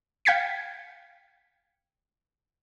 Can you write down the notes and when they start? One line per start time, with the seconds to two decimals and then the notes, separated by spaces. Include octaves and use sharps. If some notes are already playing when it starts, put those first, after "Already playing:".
0.25 F5 G5 G#6 B6 C#7